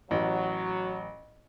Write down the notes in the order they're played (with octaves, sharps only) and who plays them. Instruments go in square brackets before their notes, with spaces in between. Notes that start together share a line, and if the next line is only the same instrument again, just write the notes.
[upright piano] A1 [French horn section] F#3